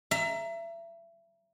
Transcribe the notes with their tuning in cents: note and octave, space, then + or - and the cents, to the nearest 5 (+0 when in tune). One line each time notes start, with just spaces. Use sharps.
E5 +30 A#5 +0